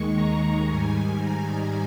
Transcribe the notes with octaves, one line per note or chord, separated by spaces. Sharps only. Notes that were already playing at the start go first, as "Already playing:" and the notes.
Already playing: D#2 D#3 G#3 C#6
A#5
G#2 D#3 G3 G#5
A#5